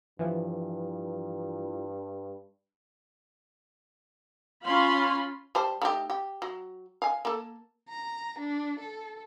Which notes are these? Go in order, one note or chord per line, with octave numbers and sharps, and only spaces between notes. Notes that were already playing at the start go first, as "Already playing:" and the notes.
G2 E3 F3
C#4 F4 F5 B5 C6
G3 C5 A5
A3 D#4 G4
G4
F#3
F5 G#5
A#3 A4
A#5
D4
A4